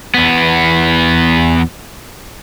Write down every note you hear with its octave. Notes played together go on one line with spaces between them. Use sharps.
E2 B3